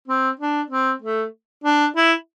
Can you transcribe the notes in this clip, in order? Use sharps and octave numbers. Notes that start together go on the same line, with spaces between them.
C4
D4
C4
A3
D4
E4